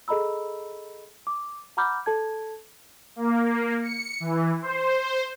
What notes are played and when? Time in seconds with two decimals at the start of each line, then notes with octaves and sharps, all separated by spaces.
0.08 G#4 A4 D#5 A#5 B5 E6
1.27 D6
1.77 F#5 A#5 B5 D6 F6 G6
2.06 A4 A5 G#6
3.16 A#3
3.82 C#7
4.20 E3
4.62 C5